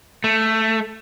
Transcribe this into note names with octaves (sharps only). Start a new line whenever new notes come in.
A3